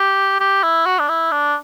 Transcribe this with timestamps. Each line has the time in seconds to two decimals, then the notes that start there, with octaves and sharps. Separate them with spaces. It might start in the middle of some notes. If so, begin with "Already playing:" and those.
Already playing: G4
0.40 G4
0.63 E4
0.86 F#4
0.99 D4
1.09 E4
1.31 D4